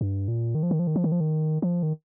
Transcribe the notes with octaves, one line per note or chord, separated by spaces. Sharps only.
G2
A#2
D#3
F3
D#3
F3
D#3
F3
D#3
F3
D#3
F3
D#3